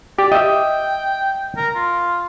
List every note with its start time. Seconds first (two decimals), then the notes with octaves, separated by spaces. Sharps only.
0.19 G4 D5
0.32 D#5 E5 G5
1.57 A#4
1.76 F4